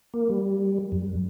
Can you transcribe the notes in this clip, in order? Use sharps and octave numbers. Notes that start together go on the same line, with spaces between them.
A#3
G3
F#2